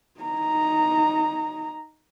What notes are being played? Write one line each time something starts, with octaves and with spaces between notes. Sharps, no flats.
D#4 A#5